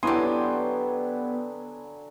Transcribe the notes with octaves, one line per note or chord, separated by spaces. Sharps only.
D3 F#3 B3 E4 G4 G#5 C6 D#6